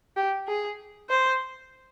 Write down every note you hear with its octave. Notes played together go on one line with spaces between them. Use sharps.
G4
G#4
C5